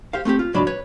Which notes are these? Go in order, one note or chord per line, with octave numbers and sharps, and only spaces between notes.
G4 C5 F5
A3 C4 F4 G4
F4
C#2 G#2 F#3 D4 D5 B5
B4 C#5